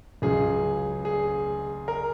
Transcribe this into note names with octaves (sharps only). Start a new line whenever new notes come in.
C#2 C#3 F#3 G#4
G#4
A#4